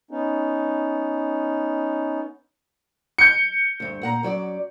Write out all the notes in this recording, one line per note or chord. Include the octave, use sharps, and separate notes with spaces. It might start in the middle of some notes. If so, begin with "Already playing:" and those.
B3 C#4 D#4
G6 C#7
D2 G2
A#2 F#5 A#5
F#2 F#3 D5